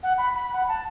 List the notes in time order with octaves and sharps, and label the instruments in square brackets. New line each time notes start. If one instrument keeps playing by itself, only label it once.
[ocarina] F#5
B5
B5
F#5
A5